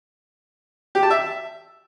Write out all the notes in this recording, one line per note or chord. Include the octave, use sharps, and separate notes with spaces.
G4
A5
E5